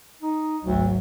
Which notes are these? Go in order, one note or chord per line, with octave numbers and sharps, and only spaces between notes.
D#4
G#1 D2 F#3